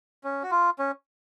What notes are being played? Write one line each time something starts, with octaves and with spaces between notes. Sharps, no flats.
C#4
F#4
F4
C#4